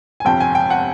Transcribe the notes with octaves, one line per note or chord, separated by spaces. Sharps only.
G#5
G1 F2 C3 G5
G#5
G5
F#5